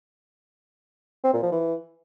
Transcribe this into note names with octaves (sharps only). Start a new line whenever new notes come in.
C4
A#2
F3
E3